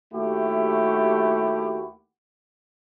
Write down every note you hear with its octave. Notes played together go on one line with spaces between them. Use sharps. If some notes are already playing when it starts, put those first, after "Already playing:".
D#2 A3 E4 F#4 G4